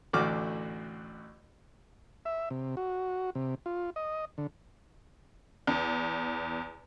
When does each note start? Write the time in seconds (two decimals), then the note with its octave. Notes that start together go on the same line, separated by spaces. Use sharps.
0.13 A1 D2 A3 F#4 D6 F6
2.25 E5
2.50 C3
2.77 F#4
3.35 C3
3.66 F4
3.96 D#5
4.38 D3
5.67 E2